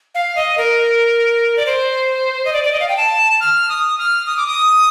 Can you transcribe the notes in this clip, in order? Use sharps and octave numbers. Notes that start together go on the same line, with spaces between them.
F5
D#5
A#4
D5
C5
D#5
D5
D5
D#5
F5
G5
A5
F6
D#6
F6
D#6
D6
D#6